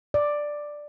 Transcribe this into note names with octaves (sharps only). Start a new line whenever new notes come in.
D5